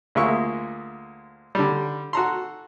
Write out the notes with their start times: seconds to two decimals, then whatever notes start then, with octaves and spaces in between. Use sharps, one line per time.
0.15 D2 G#3 A#3 F4 E5 C#6
1.55 D3 G3
2.13 F#4 A4 A#5 C6